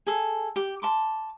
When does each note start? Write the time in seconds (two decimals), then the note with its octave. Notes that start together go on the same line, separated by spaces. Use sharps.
0.07 G#4 A4
0.56 G4
0.82 A5 C6 D6